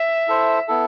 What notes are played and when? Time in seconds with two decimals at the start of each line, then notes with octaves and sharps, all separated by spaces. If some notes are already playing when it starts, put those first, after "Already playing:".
Already playing: E5
0.28 E4 A4 C5
0.68 B3 E4 A4